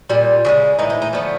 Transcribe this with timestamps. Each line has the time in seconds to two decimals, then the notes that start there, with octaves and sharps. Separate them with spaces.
0.09 A#2 G3
0.45 C#3 E3 G#3
0.79 A2 E3 G#3 D#4
0.90 D#4
1.02 D#4
1.13 D3 F3 A3 B3